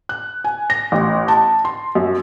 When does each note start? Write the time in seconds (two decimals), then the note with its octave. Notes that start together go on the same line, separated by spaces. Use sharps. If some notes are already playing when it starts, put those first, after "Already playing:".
0.09 F#6
0.44 G#5
0.70 A#6
0.92 A1
1.28 A5
1.65 C6
1.95 F#2